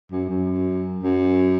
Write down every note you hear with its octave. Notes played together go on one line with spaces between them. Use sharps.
F#2
F#2
F#2